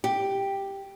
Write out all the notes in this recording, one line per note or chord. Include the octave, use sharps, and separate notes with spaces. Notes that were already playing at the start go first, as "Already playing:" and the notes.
G4